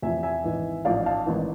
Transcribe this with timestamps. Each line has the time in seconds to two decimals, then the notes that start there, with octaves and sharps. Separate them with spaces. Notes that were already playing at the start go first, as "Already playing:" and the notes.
0.02 E2 C3 F3 E5 G#5
0.23 E5 G#5
0.44 G#1 G#2 E3
0.85 A1 G#2 F3 D5 F5
1.06 F5 A5
1.26 G#1 G#2 E3